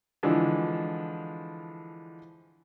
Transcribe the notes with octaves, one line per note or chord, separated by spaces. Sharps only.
D3 E3 F3 G#3 D4